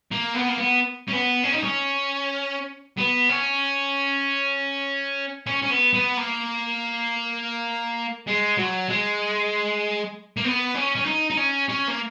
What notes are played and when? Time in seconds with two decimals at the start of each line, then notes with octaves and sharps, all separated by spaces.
0.12 A#3
0.35 B3
0.49 A#3
0.58 B3
1.08 C#4
1.13 B3
1.44 C#4
1.53 D#4
1.64 C#4
2.98 B3
3.30 C#4
5.47 C#4
5.63 C#4
5.70 B3
5.94 B3
6.17 A#3
8.27 G#3
8.57 F#3
8.89 G#3
10.37 A#3
10.44 B3
10.75 C#4
10.96 C#4
11.06 D#4
11.30 D#4
11.37 C#4
11.69 C#4
11.88 A#3